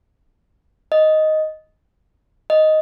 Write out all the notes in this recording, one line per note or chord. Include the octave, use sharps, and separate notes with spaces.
D#5
D#5